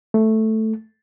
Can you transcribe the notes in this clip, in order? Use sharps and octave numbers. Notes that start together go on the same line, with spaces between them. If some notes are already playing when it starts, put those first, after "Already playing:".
A3